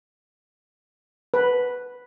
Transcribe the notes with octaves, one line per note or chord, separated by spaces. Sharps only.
B4